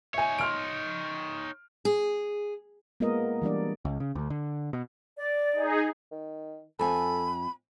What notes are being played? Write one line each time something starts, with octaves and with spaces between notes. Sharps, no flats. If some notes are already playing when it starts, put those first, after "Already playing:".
D#4 C#5 E5 G#5
C6 F6 D7
G#4
G#3 A#3 B3 F4 A#4 D#5
E3 G3 D4 D5
C#2
C#3
D2
D3
B2
D5
D#4 G#4
D#3
F2 A4 G#5 B5